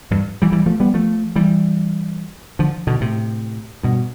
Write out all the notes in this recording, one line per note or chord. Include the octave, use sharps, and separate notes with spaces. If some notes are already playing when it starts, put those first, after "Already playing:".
E2 G2
E3 G3
E3 G3
F3 A3
G3 B3
F3 A3
E3 G3
D3 F3
B2 D3
A2 C3
G2 B2